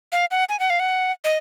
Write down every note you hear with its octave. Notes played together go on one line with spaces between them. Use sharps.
F5
F#5
G#5
F#5
F5
F#5
D#5